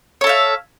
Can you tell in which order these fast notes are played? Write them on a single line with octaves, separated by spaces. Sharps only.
C#5 A4 E5 F5